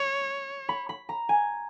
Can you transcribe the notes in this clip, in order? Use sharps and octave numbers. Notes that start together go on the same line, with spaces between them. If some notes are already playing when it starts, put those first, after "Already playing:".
Already playing: C#5
B5
B5
A#5
G#5